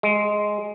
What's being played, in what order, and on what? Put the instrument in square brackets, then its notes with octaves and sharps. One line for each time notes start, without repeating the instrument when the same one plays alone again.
[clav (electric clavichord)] G#3